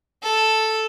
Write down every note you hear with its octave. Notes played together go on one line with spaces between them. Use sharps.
A4